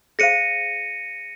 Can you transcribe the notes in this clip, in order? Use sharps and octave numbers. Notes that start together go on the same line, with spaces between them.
G#4 C5 F5 A#6 C#7 D#7